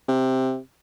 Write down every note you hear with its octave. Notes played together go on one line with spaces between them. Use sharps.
C3